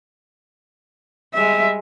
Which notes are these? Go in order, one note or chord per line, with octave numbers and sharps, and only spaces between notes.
G3 G#3 E5